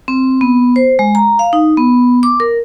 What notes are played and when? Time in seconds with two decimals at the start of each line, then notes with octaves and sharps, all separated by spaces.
0.08 C4
0.41 B3
0.76 C5
0.99 G#3
1.15 A#5
1.39 F5
1.53 D#4
1.77 B3
2.23 D6
2.40 A#4